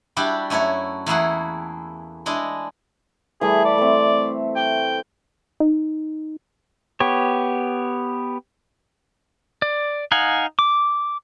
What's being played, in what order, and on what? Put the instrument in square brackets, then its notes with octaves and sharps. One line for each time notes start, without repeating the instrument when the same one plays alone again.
[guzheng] G3 D4 E4 F#4 G4
F#2 A3 E4 F#4 C#5
E2 A3 A#3 E4 G#4 F#5
G#3 D4 E4 D#5
[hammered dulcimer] E3 G3 A3 [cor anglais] G#4
[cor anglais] D5
[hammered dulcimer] A3 C4
[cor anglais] G5
[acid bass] D#4
[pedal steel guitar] B3 G4 C#5
D5
D#4 F5 F#5 G#5
D6